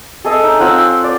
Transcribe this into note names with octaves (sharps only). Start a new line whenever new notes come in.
G#4 A4 D#5 E5
D#4
C4 F4 F#5 E6
D5